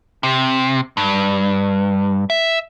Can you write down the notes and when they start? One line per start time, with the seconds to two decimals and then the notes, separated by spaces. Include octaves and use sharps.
0.23 C3
0.97 G2
2.30 E5